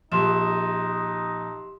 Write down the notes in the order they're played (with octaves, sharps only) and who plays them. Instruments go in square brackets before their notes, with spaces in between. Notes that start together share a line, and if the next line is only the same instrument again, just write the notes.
[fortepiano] A#1 [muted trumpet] D#4 [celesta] G4 C6 E7